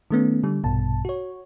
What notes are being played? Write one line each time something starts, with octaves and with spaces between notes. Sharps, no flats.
D#3 A3 B3 C#4
D3 G3
A#1 G2 B2 A5
F#4 C#5